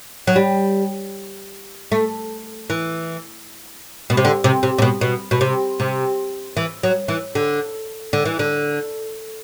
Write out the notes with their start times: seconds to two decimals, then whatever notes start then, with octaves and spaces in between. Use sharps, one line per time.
0.27 F#3
0.36 G3
1.92 A3
2.70 E3
4.10 B2
4.17 C3
4.25 D3
4.44 C3
4.63 C3
4.78 C3
4.82 B2
5.01 B2
5.31 B2
5.41 C3
5.80 C3
6.57 E3
6.83 F#3
7.08 E3
7.35 D3
8.13 D3
8.25 E3
8.39 D3